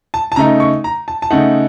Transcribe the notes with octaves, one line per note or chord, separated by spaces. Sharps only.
A5
A5
C#3 A3 D#4 A#5
C#6
A#5
A5
A5
C#3 A3 D#4 F#5